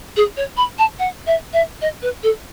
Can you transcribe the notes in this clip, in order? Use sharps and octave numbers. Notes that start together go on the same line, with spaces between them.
G#4
C#5
B5
A5
F#5
E5
E5
D#5
B4
A4